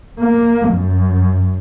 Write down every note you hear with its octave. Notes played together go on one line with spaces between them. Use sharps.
A#3
F#2